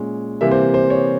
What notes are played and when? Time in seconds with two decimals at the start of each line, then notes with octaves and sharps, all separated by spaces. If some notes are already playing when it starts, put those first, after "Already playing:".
Already playing: A#2 G#3 C#4
0.41 C3 E3 G3 A#3 E5
0.51 C5
0.74 C5
0.90 C#5